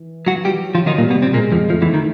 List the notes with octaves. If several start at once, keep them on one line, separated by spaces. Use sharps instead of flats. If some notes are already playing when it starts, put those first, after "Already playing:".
Already playing: E3
F#3 F#4
G3 G4
F#3
F3 F4
D#3 D#4
A#2 G3 A#3
B2 B3
C3 C4
A#2 G#3 A#3
F2 F3
F2 F3 A3
E2 E3
D#3